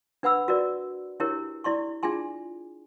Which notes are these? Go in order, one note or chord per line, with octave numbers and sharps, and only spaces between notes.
D4 B4 F#5 B5 E6
F#4 A#4 B4 D5
D4 E4 G4 A#4 C#5
E4 D5 C6 C#6
D4 F4 G#4 G#5 C6